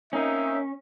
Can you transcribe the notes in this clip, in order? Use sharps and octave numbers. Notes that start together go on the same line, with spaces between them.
A#3 C4 C#4 D#4 E5